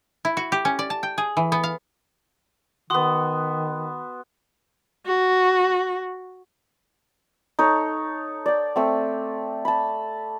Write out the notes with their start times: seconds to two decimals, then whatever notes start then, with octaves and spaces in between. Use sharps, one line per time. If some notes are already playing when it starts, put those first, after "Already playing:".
0.25 E4
0.37 F#4
0.52 G4
0.65 C#4
0.79 D5
0.90 A5
1.03 G5
1.18 G#4
1.37 E3
1.52 B3
1.63 F5
2.90 D#3 B3 F#4 C6 D#6
5.06 F#4
7.59 D#4 A4 C#5
8.46 D5 G5
8.76 A3 C4
9.65 A5 B5